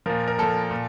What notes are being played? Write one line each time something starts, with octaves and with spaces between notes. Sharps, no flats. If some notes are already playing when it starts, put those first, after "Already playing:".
A#2 F3 A#4
A#4
A#2 F3 A4
A#2